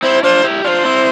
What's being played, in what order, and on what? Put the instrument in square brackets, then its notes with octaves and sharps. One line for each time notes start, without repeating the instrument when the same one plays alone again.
[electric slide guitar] C4 E4 [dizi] C5
[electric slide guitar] D4 F4 [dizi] C5
[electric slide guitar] E4 G4
[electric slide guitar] D4 F4 [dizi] C5 D5
[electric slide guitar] C4 E4